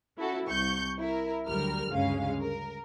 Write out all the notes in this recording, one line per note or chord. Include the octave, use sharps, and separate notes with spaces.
C#4 E4 F#4 A4
C2 C#6 G6
E4 A#4
D2 F#3 G3 A#4 F6
D2 G2 C#3 G#3 C#4 F5
A#4